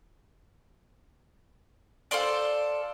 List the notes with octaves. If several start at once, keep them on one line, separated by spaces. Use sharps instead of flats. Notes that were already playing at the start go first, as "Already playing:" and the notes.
F4 A4 C5 D5